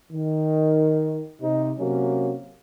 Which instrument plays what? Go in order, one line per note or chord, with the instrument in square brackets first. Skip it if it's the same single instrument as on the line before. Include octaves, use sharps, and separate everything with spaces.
[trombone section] D#3
C3 D#4
C3 F#3 A#3 C#4